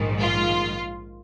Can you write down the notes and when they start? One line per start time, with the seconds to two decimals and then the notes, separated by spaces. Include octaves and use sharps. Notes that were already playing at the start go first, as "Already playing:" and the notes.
Already playing: A#1 G#2 D#3
0.19 F4